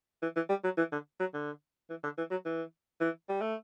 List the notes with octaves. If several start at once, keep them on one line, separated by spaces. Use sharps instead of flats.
E3
E3
G3
F#3
E3
D3
F#3
D3
E3
D3
E3
F#3
E3
E3
G3
A3